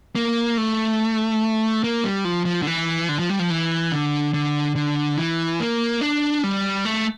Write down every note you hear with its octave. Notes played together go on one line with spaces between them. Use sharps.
A#3
A3
A#3
G3
F3
F3
D3
E3
D3
F3
G3
F3
E3
D3
D3
D3
E3
A#3
D4
G3
A3